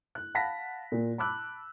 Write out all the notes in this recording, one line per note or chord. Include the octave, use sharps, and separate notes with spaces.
F#6
F5 F#5 A5 B5 A#6 B6
A#2
A5 B5 D6 E6 F#6